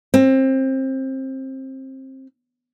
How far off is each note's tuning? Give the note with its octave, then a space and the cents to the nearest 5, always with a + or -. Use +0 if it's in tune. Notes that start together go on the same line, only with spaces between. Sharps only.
C4 +25